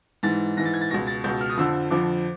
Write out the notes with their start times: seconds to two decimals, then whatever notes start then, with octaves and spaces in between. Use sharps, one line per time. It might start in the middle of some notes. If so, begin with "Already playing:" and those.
0.23 G#2 E3 A6
0.57 G#2 E3 A#6
0.65 A6
0.74 G#6
0.81 A6
0.90 C#2 B2 A#6
1.07 A6
1.24 C#2 B2 G6
1.41 F6
1.50 D#6
1.58 F2 D3 F3 E6
1.91 F2 D3 F3 D6